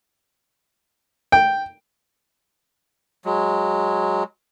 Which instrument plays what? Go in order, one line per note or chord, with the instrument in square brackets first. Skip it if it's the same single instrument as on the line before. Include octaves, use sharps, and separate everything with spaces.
[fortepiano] G5
[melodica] F#3 G#3